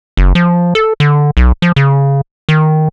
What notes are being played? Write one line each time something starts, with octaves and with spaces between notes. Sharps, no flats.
F#1
F3
A4
D3
B1
F3
C#3
D#3